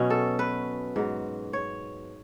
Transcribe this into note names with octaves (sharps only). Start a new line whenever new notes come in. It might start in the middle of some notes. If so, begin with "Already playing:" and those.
Already playing: B2 F#3 C#4
A4
B4
G#2 F#3
C#5